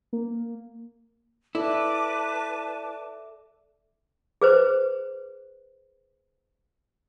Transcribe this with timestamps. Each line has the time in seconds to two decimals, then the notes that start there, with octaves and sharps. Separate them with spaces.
0.13 A#3
1.55 E4 A4 B4 D5 E5 A5 D6
4.41 G#4 B4 C5